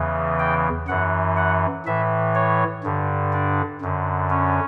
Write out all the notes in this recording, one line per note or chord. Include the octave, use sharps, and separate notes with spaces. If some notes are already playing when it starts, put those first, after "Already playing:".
Already playing: E2 C#3 E3
G5
F#2 E3 F#5
F#5
A2 E3 E5
C#5
G2 D3
D4
F#2 D3
C#4